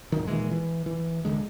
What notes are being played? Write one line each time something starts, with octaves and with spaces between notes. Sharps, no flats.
D#1 G#1 F#2 D#3
A#2 D#3 E3 G#3
E3
E3
D#1 F2 D3 G#3